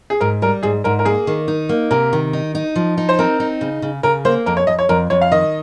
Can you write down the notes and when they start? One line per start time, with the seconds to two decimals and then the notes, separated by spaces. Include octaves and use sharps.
0.10 G#4
0.20 G#2 A#4
0.42 G3 A#4
0.63 G#2 G#4
0.84 G#2 A#4
0.99 A#4
1.05 A#3 G#4
1.27 D#3
1.48 D#4
1.69 A#3
1.91 C3 A#4
2.13 D#3
2.33 D#4
2.55 D#4
2.76 F3
2.97 D#4
3.09 C5
3.19 C4 A#4
3.40 D#4
3.61 C#3
3.82 C#3
4.03 C#3 A#4
4.25 A#3 C5
4.46 F2 A#4
4.57 C#5
4.67 F2 D#5
4.79 C#5
4.89 F2 A#4
5.10 F2 C#5
5.21 F5
5.32 D#3 D#5